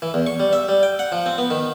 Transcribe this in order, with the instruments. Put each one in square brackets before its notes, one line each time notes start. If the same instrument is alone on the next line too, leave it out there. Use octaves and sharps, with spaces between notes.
[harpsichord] E3
E2
C#6
G3
E5
G3
G5
F#5
F3
C4
B3
D#3